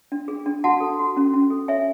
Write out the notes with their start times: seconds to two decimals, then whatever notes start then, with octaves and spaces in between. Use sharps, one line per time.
0.12 D4
0.28 G#4
0.46 D4
0.64 F#4 F#5 A5
0.80 A4
0.99 F#4
1.17 C#4
1.33 C#4
1.51 A4
1.68 C#5 E5 G#5